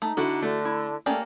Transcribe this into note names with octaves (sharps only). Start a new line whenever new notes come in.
A3 D#4
D3 E4 F#4 A4
D3 A3
E4
A3 A#3 C#4 G4 D5